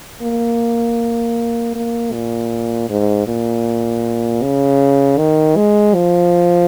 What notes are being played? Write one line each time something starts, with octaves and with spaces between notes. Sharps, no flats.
A#3
A#3
A#2
G#2
A#2
C#3
D#3
G#3
F3